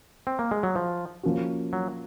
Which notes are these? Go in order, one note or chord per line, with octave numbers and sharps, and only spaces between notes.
C4
A#3
G#3
F#3
F3
F3 A#3 C#4 F#4
F#3